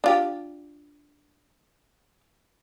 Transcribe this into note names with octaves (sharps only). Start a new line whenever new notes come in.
D4 F4 G4